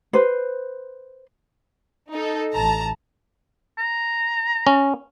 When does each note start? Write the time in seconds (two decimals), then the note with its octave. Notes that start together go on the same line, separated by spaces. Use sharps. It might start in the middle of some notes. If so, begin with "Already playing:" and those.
0.13 B4 C5
2.12 D#4 A4
2.54 A1 A5 A#5
3.78 A#5
4.67 C#4